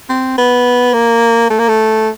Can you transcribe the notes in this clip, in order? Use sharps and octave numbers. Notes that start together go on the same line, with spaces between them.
C4
B3
A#3
A3
A#3
A3